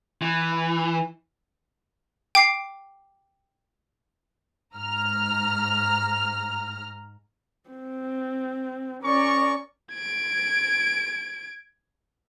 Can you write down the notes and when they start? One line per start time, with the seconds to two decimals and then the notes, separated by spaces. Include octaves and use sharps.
0.22 E3
2.35 G5 D6 C7
4.74 G#2 A#5 F6
7.70 C4
9.03 C#4 A#4 D5 A#5 C#6
9.94 G#6 D7